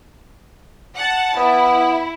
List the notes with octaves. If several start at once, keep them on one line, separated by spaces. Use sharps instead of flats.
F#5 A5
B3 E4